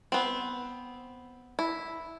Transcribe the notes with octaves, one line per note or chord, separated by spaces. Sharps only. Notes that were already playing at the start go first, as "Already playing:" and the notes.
B3 C4
E4